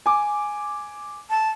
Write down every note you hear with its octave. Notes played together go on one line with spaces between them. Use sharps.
G#5 D6
A5